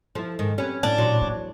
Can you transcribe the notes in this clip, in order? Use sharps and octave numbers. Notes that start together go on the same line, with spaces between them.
F3 E4 A4
G#2 D#3
C4 C#4 G4 B4
A2 D4
E2 A#2 F#3 C5
A#3